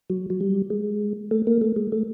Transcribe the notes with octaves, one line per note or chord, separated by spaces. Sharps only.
F#3
F#3
G3
G#3
A3
A#3
A3
G#3
A3